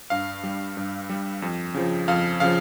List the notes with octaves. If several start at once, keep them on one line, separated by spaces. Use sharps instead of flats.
G2 F5
G3
G2
G3
F2
C#3 F3
F2 F5
C#3 F3 F5